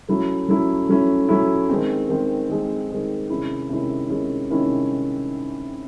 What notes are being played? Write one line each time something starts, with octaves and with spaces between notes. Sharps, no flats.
F#3 A3 C#4 E4
F#3 A3 C#4 E4
F#3 A3 C#4 E4
F#3 A3 C#4 E4
D#3 G#3 C4
D#3 G#3 C4
D#3 G#3 C4
D#3 G#3 C4
C3 D#3 G#3 C#4 E4
C3 D#3 G#3 C#4 E4
C3 D#3 G#3 C#4 E4
C3 D#3 G#3 C#4 E4